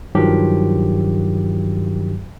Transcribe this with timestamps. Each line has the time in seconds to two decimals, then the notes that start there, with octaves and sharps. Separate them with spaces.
0.15 G2 D#3 F3 F#3 G4